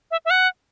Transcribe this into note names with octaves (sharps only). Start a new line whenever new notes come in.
E5
E5
F#5